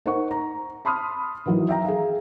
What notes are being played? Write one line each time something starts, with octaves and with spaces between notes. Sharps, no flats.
D#4 A#4 C5 F#5 C#6
A#5
A5 B5 C6 D#6 F6
D#3 E3 F#3 D#4 E4
E5 G5 A#5
G#4 F5